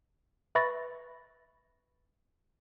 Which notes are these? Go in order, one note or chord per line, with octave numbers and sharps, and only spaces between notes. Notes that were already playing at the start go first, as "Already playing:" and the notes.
B4 E5 B5 C#6 A6 A#6